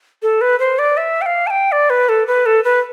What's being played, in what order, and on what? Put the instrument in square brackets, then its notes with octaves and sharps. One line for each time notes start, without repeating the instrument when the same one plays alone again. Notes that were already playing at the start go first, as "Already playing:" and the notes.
[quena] A4
B4
C5
D5
E5
G5
F5
A5
G5
D5
B4
A4
B4
A4
B4